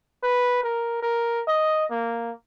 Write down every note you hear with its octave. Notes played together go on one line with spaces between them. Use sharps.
B4
A#4
A#4
D#5
A#3